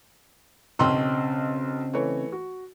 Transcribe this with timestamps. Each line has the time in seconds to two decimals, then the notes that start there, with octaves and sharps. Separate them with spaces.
0.79 B1 C#3 C4 D#5 C6 E6
1.93 E3 A3 C#5
2.32 F#4